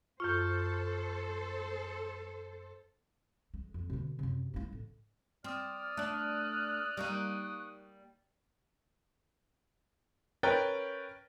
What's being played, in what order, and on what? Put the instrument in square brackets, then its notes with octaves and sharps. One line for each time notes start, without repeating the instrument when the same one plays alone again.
[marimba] F#2 F4 [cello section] A4 C5 [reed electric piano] C#6 F6 G6
[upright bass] G#3
F2
B2 D3
F#2 C3
G#3 E4
A2
[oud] C4 [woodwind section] D5 D#6 F6
[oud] A3 D4 [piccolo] F#6
[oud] G3 A#3 D#4 [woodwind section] C#6 D#6
[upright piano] C#4 A#4 B4 G5 C#6 A6